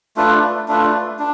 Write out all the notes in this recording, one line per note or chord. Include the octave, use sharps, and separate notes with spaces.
A3 D4 F4 B4
A3 D4 F4 B4
D4